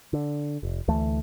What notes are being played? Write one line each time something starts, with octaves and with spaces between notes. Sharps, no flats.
D3
F1
D2 E3 A3